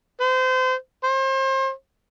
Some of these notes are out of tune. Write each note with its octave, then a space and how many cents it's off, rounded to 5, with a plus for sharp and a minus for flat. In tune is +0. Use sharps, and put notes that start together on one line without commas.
C5 -30
C5 +35